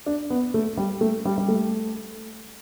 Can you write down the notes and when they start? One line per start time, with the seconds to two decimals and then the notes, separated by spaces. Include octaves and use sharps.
0.06 D4
0.30 B3
0.54 A3
0.77 G3
1.01 A3
1.25 G3
1.38 G3
1.48 A3